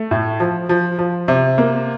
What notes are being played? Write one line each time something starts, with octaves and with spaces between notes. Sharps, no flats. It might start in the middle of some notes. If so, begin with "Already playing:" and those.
Already playing: A3
A2
F3
F3
F3
C3
A#3